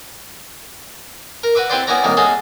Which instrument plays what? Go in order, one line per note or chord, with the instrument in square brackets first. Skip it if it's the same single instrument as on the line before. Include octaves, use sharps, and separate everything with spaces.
[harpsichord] A#4
F#4 B4 E5 D6
C4 E4 G4 B4 C5 D5
B3 C#4 E4 F#4 D5 A#5
C2 A2 D#3 A#3
C#4 D#4 F#4 G#4 A4